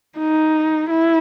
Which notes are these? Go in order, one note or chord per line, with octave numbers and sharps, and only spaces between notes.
D#4
E4